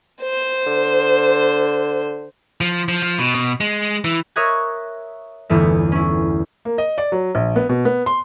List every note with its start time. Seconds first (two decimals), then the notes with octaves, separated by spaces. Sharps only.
0.22 C5
0.66 D3
2.61 F3
2.88 F3
3.03 F3
3.19 B2
3.35 B2
3.60 G#3
4.04 E3
4.36 A#4 C#5 E5 D#6 F#6 G#6
5.50 G1 E2 A3 E5
5.92 C#4 E4
6.65 A#3
6.78 D#5
6.98 D5
7.12 F#3
7.35 A#1
7.56 B3
7.69 B2
7.85 B3
8.06 C6